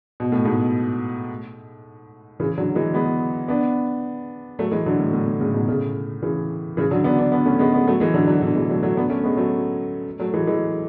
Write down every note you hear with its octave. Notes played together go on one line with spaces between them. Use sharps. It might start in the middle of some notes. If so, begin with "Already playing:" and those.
B2
A2
G#2 B2
C#3 E3
D3 F#3
E3 G#3
G#3 B3
B3 D4
F#3 A3
E3 G#3
D3 F#3
A2
A2
A2
A2 C#3
G#2 B2
A2 C#3
C#3 E3
C#3 E3
D3 F#3
B3 D4
B3 D4
B3 D4
A3 C#4
G#3 B3
G#3 B3
F#3 A3
E3 G#3
D3 F#3
D3 F#3
B2 D3
E3 G#3
F#3 A3
F#3 A3
B3 D4
A3 C#4
G#3 B3
F#3 A3
F#3 A3
E3 G#3
E3 G#3